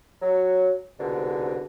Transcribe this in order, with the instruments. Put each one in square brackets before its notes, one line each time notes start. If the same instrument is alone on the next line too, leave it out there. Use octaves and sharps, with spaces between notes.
[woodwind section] F#3
C2 G#2 B2 D3